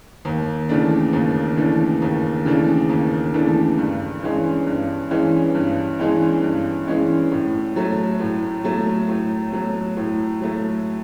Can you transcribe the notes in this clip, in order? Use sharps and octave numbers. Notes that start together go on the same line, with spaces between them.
D#2
C#3 E3 A3 D4
D#2
C#3 E3 A3 D4
D#2
C#3 E3 A3 D4
D#2
C#3 E3 A3 D4
G2
E3 G#3 C#4
G2
E3 G#3 C#4
G2
E3 G#3 C#4
G2
E3 G#3 C#4
A2
F#3 A3
A2
F#3 A3
A2
F#3 A3
A2
F#3 A3